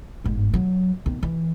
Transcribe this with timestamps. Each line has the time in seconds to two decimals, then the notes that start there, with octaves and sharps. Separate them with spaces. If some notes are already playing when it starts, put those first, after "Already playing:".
0.24 G1 G#2
0.54 F#3
1.06 D#3 B3
1.23 E3